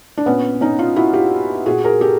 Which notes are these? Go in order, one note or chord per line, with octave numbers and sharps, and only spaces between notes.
D4
A#2 B3 C#4
C#4 D#4
D#4 F4
E4 F#4
F4 G4
A#2 F#4 G#4
G#4 A#4
G4 A4